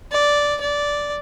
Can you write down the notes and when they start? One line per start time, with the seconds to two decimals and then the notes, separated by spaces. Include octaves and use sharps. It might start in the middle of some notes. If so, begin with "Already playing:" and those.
0.12 D5
0.61 D5